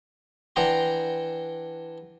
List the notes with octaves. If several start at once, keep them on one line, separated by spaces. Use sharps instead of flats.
E3 D4 F#5 G5 A#5 C6